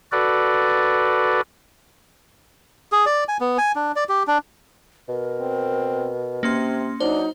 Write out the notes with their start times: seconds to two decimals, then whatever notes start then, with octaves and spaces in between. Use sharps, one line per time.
0.12 F#4 A4 B4 D5
2.92 G#4
3.06 D5
3.28 G#5
3.41 B3
3.58 G#5
3.75 D4
3.96 D5
4.09 G4
4.27 D4
5.08 B2 A#4
5.41 C4
6.43 C3 A#3 C#4 C6
7.00 F#3 D4 D#4 C5